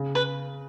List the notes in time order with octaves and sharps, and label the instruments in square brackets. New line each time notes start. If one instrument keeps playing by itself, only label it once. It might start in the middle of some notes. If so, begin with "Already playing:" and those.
Already playing: [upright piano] C#3
[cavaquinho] B4